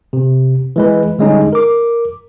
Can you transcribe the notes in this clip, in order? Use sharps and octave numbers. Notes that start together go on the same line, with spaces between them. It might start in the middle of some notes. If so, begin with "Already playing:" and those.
C3
E3 G#3 B4
D3 G3 G#3 C#4 D#4
A#4 D6